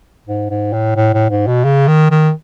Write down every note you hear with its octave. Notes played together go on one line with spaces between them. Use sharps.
G#2
G#2
A2
A2
A2
G#2
B2
C#3
D#3
D#3